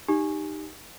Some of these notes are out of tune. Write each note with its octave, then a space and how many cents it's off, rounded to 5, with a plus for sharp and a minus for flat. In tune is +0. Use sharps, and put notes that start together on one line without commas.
D#4 -10 G4 +0